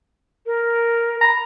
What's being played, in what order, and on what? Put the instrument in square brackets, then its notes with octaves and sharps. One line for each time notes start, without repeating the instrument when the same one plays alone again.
[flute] A#4
[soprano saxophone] A#5 [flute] B5